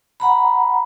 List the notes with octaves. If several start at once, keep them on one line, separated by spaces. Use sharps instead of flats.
F#5 A#5 B5